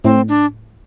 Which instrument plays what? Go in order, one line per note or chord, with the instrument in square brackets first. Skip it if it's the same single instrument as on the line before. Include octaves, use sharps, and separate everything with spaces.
[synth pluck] A2 [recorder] C4
[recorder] D4